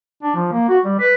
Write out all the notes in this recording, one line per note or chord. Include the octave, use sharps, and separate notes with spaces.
D4
F3
A#3
F#4
G3
B4